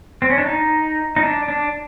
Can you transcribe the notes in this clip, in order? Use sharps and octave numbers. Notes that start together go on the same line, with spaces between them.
C4
C#4
D4
D#4
D#4
D4
D4